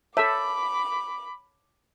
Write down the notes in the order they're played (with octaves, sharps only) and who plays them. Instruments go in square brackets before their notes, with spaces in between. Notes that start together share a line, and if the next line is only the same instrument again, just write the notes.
[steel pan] A4 E5 [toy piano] C#5 A5 [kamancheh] B5 D6